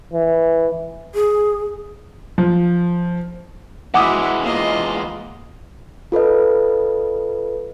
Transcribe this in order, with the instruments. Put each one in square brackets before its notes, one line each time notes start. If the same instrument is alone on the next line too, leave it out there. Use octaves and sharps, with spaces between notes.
[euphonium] E3
[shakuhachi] G#4
[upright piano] F3
[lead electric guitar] E3 G#3 [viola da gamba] E4 F#4 [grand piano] F#5 D6 D#6
[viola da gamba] A#3 F4 D#5
[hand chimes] F4 A4 B4 D#5